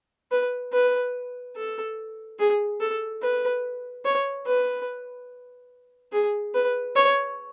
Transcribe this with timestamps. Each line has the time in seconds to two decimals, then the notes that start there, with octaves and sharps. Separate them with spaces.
0.31 B4
0.73 B4
1.56 A4
2.39 G#4
2.80 A4
3.22 B4
4.05 C#5
4.46 B4
6.12 G#4
6.54 B4
6.95 C#5